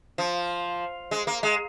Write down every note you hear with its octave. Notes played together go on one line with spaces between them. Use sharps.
F3
G#3
A#3
G#3